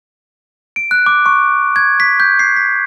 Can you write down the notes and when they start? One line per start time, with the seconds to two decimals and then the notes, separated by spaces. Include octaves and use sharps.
0.76 D7
0.91 F#6
1.06 D6
1.26 C#6
1.76 G#6
2.00 B6
2.20 G6
2.39 C7
2.56 B6